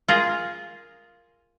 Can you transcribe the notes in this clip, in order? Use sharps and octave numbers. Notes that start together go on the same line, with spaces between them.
F4 G#4 A#4